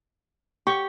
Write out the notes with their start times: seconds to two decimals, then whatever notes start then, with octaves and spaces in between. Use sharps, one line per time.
0.67 G4 C#6